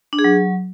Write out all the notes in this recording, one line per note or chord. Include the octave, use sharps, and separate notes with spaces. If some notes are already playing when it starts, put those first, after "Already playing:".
D4
G#4
F#3